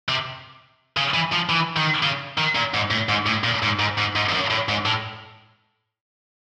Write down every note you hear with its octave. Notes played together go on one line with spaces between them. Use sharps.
C3
C#3
E3
F3
E3
D#3
C#3
D#3
A#2
G#2
A2
G#2
A2
A#2
G#2
G#2
G#2
G#2
F2
F#2
A2
G#2
A2